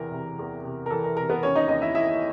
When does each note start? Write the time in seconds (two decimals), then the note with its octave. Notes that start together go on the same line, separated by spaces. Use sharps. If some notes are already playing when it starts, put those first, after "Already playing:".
Already playing: E2 C3 E3 A#4
0.12 C3
0.39 E2
0.64 C3
0.86 A#4
0.90 E3 A4
1.04 A#4
1.17 C3 A#4
1.29 B3 B4
1.43 D#2 C#4 C#5
1.55 D#4 D#5
1.68 D#2 D#4 D#5
1.82 E4 E5
1.95 D#2 E4 E5